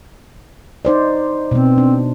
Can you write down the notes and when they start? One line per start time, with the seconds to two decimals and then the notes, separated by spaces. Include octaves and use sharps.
0.85 D#4 C5 D5
1.51 B2 B3 C4
1.78 D4